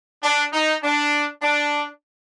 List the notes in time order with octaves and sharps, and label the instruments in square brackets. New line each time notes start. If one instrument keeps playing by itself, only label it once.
[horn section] D4
D#4
D4
D4